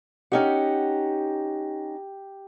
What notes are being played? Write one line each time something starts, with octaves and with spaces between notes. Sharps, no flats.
C#4 D#4 G4 F#5